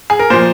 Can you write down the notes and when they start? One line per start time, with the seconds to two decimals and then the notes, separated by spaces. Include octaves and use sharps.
0.10 G#4
0.19 A#4
0.30 A#2 F3 C5